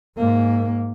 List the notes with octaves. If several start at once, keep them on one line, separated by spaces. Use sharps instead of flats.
G#2 A#3